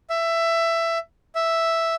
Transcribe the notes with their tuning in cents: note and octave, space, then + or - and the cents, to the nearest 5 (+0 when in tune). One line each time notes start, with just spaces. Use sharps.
E5 +15
E5 +0